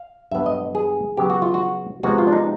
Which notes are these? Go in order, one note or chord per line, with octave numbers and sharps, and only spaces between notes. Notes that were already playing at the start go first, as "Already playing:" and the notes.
Already playing: F5
G2 D3 F#3 B3 E5
D#5
G#4
C#3 F#3 B3 G4
F#4
F4
F#4
C3 F3 G#3 B3 F#4
F4
D4
D#4